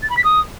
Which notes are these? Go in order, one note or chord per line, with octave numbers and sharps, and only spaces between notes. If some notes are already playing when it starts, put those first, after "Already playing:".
A6
B5
B6
D#6